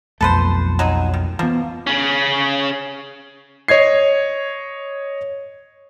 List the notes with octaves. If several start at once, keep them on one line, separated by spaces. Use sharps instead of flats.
B1 F2 A3 A4 B4 C5
F#3 D#4 G#4
D#3
E3 F3 A#3 B3
C#3 C#4
C#5 D#5 G#6 C7